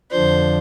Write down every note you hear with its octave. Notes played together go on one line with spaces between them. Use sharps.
F2 D3 F3 D4 C5